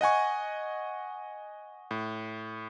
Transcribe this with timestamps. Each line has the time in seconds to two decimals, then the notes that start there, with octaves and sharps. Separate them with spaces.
0.01 D#5 F#5 G#5 C#6
1.91 A2